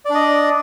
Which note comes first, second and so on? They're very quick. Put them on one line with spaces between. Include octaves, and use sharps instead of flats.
D5 D4 D#5